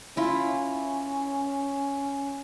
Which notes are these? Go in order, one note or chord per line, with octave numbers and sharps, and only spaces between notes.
C#4 E4 F4